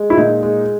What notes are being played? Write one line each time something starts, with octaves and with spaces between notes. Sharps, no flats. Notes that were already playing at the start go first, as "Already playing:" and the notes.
Already playing: G#3
E4
A#2 D#4
G#3